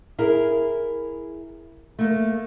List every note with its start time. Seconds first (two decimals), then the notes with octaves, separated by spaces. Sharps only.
0.18 E4 G#4 A#4
1.99 A3 A#3